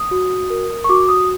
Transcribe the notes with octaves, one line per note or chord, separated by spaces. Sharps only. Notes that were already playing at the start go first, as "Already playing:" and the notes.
Already playing: D#6
F#4
A#4
C#6
F#4 D6
D#6